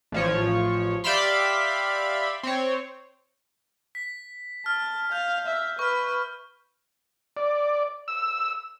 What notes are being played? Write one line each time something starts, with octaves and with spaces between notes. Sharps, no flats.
A1 F3 C#5
G4 D5 E5 F5 B5 C6
C4 C#5
B6
A5 F6
F5 G6
E5
B4 C#6 F6
D5
E6